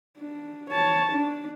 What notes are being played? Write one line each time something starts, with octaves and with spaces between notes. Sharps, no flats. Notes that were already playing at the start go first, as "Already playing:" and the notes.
D4
C#5 A5
D4